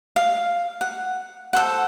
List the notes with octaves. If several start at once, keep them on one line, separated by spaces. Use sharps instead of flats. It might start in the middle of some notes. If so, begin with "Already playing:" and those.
F5
F#5
A4 C5 F#5